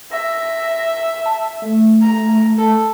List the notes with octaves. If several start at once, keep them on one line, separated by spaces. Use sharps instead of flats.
E5 A#6
A5
A3
A#5
A4